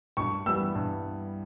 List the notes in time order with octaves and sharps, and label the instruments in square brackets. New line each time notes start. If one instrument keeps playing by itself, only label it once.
[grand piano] G2 [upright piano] C#6
[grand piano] E3 G3 B3 [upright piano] E6
[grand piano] G2